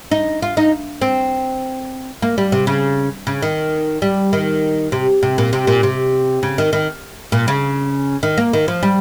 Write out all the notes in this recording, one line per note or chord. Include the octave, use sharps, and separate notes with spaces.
D#4
F4
D#4
C4
A#3
G3
C3
C#3
C#3
D#3
G3
D#3
C3
C3
A#2
C3
A#2
C3
C#3
D#3
D#3
A#2
C#3
D#3
A#3
D#3
F3
G3